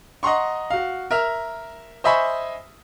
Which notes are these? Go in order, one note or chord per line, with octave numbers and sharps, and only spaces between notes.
D#5 F#5 A#5 C6 C#6
F#4 F5
A#4 E5 F6
C5 D#5 E5 G#5 B5 C#6